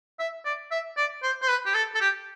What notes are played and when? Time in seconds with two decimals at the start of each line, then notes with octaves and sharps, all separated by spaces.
0.19 E5
0.45 D5
0.71 E5
0.97 D5
1.23 C5
1.42 C5
1.48 B4
1.66 G4
1.74 A4
1.95 A4
2.00 G4